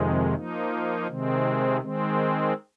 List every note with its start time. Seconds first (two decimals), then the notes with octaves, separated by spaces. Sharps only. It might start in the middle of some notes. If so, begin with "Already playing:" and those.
Already playing: F2 C3 D#3 G#3
0.35 F3 A#3 D#4
1.08 C3 D#3 G#3 C4
1.81 D#3 G#3 C4